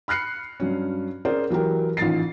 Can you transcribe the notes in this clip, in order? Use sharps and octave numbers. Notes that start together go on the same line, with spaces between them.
B5 F6 F#6 C7 C#7
G2 F#3 C#4
C#4 G#4 A#4 C5 D5
E3 F#3 G4 A#4
A1 D#3 F4 A6 C7